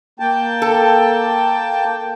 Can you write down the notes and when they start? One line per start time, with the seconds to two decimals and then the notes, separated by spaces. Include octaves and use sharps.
0.20 A#3 G5 A5
0.62 A4